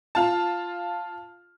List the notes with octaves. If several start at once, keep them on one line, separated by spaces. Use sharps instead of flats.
F4 A5